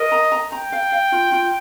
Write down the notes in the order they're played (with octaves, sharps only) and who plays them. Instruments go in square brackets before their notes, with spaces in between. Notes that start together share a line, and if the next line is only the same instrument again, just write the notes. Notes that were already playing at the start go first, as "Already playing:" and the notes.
Already playing: [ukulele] A#4 [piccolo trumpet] D#5
[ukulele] A#5
A#5
[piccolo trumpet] G5 [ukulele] A#5
[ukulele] F5
F5
F4
F4